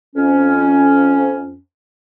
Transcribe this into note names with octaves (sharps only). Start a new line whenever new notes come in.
F2 C#4